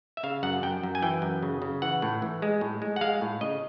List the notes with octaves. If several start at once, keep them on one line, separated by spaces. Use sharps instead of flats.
E5
C#3 F5
F#2 F#5
F#2 G5
F#2
G#5
E3 G5
F#2
C#3
C#3
E3 F#5
A2
E3
G#3
A2
G#3
F#5
G#3 F5
A2
C#3 D#5